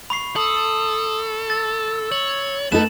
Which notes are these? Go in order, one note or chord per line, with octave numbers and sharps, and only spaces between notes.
B5 C#6 C7
A4 D#6 F#7
E6 A6
C#5 F#7
A3 B3 D#4 A4 B4 A5 E7